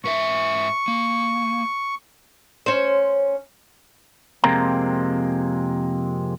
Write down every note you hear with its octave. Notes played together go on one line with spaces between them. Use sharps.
G#2 B4 E5 C#6
A#3
C#4 C5
F2 C3 G#3 A#3 C4 A#5